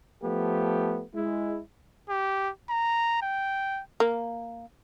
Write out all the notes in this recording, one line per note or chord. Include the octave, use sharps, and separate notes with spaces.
F3 A3 B3 G4
G#3 E4
G4
A#5
G5
A#3